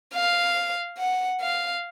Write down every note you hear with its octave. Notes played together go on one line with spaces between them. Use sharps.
F5
F#5
F5